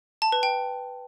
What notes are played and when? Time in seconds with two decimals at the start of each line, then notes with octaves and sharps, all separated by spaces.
0.22 A5
0.32 B4
0.43 G5